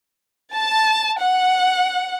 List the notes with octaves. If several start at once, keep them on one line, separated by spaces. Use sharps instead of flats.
A5
F#5